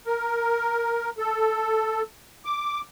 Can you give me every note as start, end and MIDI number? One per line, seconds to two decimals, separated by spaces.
0.07 1.10 70
1.18 2.02 69
2.45 2.81 86